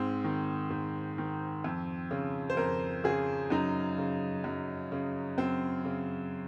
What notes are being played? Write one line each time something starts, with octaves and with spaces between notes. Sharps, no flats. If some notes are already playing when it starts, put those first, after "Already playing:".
Already playing: G#2 C4
D#3
G#2
D#3
F2
C#3
C5
F2 A#4
C#3 G#4
F#2 D#4
C#3
F#2
C#3
F#2 C4
C#3